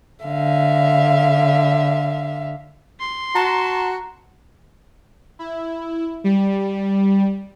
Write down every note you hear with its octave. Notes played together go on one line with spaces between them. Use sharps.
D3 E5 F5
C6
F#4 A5 A#5
E4
G3